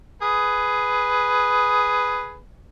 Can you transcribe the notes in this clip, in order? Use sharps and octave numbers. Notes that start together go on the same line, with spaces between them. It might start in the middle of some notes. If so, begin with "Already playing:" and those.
G#4 B4